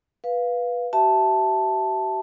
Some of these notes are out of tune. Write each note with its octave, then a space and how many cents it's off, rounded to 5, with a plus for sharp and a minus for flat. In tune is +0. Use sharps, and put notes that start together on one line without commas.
B4 -10 F5 +0
G4 -45 E5 +0 A5 +0